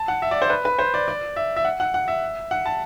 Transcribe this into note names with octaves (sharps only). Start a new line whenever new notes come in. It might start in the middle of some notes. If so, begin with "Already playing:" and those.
Already playing: A5
F#5
E5
D5
C5
B4
B4
C5
D5
D5
E5
E5
F#5
F#5
F#5
E5
F#5
A5